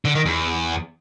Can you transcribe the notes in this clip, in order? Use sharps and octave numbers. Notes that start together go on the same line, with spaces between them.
D3
D#3
E2